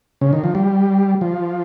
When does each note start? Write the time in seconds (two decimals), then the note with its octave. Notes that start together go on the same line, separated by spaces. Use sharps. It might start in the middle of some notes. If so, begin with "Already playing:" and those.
0.21 C#3
0.33 D#3
0.44 F3
0.55 G3
1.21 F3